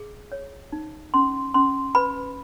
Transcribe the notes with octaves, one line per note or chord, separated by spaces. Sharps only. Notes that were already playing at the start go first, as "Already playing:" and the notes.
Already playing: G#4
C#5
D#4
C#4 C6
C#4 C6
B4 B5